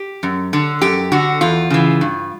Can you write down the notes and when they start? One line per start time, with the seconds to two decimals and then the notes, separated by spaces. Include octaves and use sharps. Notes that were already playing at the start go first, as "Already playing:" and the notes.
Already playing: G4
0.23 F#2
0.53 D3
0.82 F#2 G4
1.12 D3 F#4
1.41 E2 F4
1.70 C#3 E3
2.01 G2